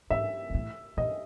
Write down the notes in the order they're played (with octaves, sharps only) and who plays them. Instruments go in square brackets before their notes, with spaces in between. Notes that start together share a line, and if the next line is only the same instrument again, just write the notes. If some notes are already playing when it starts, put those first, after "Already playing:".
[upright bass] G#2 [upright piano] E5
[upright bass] A#2
A2
[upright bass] A#2 [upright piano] D#5